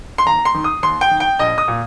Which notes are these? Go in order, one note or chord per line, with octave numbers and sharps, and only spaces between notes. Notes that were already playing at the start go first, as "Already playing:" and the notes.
C6
D#2 A#5
C6
D#3
D#6
D#2 C6
G5
D#3
G5
A#1 D#5
D#6
A#2